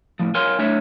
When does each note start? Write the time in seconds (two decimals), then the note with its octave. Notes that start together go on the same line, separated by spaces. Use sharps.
0.19 A2 F3
0.35 A#4 C#5 F5 G#5 C6
0.59 A3 D4 C#5 E5